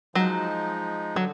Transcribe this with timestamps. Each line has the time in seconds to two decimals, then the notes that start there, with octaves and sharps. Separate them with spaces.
0.15 F3 F#3 G#3 D#4
1.16 D3 F#3